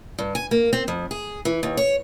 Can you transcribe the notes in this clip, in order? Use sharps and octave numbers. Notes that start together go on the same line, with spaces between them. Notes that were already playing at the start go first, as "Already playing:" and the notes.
G2
G#5
A#3
C4
F2
G#4
E3
D#2
C#5